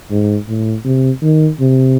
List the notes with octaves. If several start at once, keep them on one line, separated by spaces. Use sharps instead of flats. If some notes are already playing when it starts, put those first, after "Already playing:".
G#2
A2
C3
D#3
C3